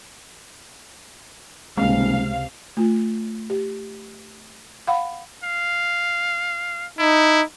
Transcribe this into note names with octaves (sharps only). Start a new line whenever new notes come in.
D#1 C#2 C3 G#3 F5
A3 F4
G4
F5 F#5 B5
F5
D#4 E4